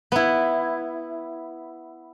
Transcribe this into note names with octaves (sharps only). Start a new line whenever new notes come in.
B3 E4